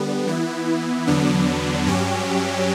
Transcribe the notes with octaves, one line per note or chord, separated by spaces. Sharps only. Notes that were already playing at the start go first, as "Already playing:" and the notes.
Already playing: D3 G3 B3
E3 B3 E4
E2 D3 F#3 B3 D4
G2 F#3 C#4 G4